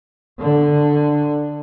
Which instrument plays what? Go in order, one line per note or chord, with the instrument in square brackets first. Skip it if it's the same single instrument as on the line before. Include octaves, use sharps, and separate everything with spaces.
[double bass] D3